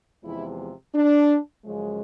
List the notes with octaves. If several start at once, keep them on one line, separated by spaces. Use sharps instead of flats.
E2 C3 F3 G#3 E4
D4
F#2 C#3 F3 G#3